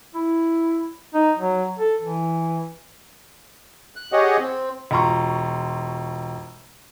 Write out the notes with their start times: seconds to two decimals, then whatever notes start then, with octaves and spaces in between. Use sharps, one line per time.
0.15 E4
1.14 D#4
1.38 F#3
1.79 A4
2.02 E3
3.96 F#6
4.12 G4 G#4 C#5 D#5 F#5
4.38 C4
4.91 E1 F4 A#5 C6 C#6